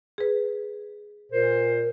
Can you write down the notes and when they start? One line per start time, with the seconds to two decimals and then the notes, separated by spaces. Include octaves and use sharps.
0.18 G#4 B4
1.32 A#2 A#4 C5